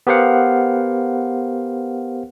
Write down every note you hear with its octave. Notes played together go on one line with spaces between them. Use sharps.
B3 G4 A#4 C5 F5 F#5